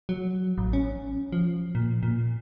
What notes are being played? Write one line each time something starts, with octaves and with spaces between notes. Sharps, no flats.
F#3
A1
C#4
F3
A#2
A#2